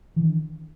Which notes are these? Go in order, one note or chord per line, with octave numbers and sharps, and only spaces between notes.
D#3 E3 D4